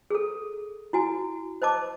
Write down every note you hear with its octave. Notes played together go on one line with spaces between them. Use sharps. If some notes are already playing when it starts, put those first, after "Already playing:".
G#4 A4
E4 F#4 G#5
C5 D#5 A5 D6